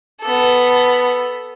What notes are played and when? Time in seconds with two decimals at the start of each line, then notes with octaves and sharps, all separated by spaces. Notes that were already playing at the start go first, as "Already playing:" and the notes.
0.21 B3 A4